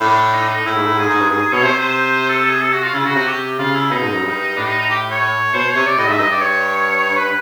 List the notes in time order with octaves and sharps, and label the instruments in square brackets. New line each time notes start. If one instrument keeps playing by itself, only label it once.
[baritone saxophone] A2 [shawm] D4
[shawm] D#4
D4
D#4
[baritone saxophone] A2 [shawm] E4
[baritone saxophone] G#2
A2
[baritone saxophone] G#2 [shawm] G#4
[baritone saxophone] G#2
G2
[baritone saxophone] G#2 [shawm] G#4
[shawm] G#4
[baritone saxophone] B2 [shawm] C#5
[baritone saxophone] C3 [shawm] C5
[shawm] C5
A4
A4
G#4
A4
F#4
F4
[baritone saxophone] C#3 [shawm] E4
[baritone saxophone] C#3 [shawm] F#4
[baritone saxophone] C3 [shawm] F#4
[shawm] G4
[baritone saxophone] C#3 [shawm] F4
[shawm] E4
[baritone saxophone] B2 [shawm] D#4
[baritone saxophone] G#2
[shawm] D#4
[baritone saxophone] F#2
G2
[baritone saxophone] A2 [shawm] D4
[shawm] D#4
D#4
G4
C#5
[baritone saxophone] B2 [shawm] C5
[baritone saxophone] C3 [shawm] C#5
[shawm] D5
[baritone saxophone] A2 [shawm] D#5
[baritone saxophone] G#2 [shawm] E5
[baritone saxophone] G2 [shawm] D#5
[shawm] D5
C#5
B4